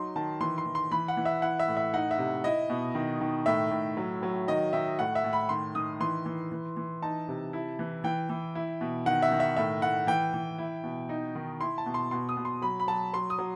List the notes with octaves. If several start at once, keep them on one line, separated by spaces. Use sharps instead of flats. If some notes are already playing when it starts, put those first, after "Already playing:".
Already playing: F#3 D#4 C6
D#3 A5
E3 C6
C6
E3
C6
E3 B5
F#5
E3
E5
E4 F#5
E5
A2
E5
D#4 F#5
E5
C3
E4 D#5
B2
D#3
D#3
A2 E5
A2
F#3
F#3
D#3 D#5
D#3 E5
A2 F#5
E5
A2
B5
D#3 C6
D#3 D#6
E3 C6
E3
E3
E3
D#4 A5
C3
E4
E3
E3 G5
E3
E4
B2
D#3 F#5
E5
D#3
E5
A2 E5
A2 F#5
E3 G5
E3
E4
B2
D#4
D#3
E4 C6
A5
B2
C6
B2 C6
D#6
B2
C6
F#3 B5
B5
F#3 A5
F#3 C6
D#6
F#3